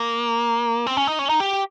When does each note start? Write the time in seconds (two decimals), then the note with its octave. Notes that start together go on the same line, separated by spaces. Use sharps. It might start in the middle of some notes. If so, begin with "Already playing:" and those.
Already playing: A#3
0.86 C4
0.97 C#4
1.07 D#4
1.19 C#4
1.29 D#4
1.40 G4